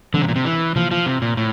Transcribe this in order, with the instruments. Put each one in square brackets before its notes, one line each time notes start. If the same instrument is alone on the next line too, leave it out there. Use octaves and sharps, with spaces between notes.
[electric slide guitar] D3 [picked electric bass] E3 G3 C4
[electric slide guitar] C3
A#2
C3
E3
[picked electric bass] C3 E3 A#3 [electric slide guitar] F3
[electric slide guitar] F3
C3
A#2
A2